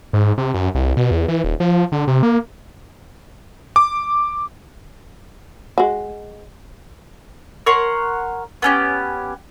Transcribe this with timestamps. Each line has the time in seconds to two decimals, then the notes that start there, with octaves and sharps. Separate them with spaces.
0.13 G#2
0.38 C3
0.54 F#2
0.75 C2
0.97 B2
1.11 E2
1.28 E3
1.44 D#1
1.60 F3
1.92 D3
2.08 C3
2.23 A#3
3.76 D6
5.78 G#3 F#4
7.66 A#4 C#5 F#5 C6
8.62 B3 C#4 G4